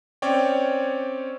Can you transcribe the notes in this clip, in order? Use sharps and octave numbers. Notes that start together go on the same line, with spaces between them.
C4 C#4 C#5 D5 G5